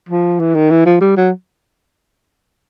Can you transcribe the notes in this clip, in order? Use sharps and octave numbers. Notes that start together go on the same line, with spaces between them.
F3
E3
D#3
E3
F3
G3
F#3